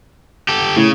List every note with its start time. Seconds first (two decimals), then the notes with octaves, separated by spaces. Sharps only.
0.48 G4 A4
0.76 A2 C#3